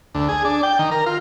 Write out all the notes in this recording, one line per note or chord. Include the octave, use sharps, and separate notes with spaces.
D2
G#4
D4
G5
D#3
A#4
F4